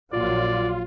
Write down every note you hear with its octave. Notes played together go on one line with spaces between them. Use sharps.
A#1 A#2 F#3 F4 D5